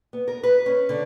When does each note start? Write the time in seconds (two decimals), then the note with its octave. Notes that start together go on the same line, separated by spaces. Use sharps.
0.13 B3
0.28 A#4
0.43 B4
0.66 C#4
0.89 D3